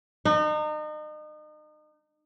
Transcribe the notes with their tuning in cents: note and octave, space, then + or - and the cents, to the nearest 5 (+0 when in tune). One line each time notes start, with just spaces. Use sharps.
D#4 -35